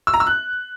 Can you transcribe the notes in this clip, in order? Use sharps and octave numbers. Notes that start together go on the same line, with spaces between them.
E6
A#5
E6
F#6